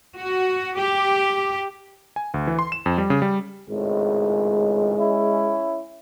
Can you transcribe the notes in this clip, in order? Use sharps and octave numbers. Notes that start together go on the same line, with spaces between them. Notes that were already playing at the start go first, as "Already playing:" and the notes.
F#4
G4
G#5
D2
E3
C6
E7
F2
G3
C#3
G3
G#1 C#2 A2 G#3
C#4 E4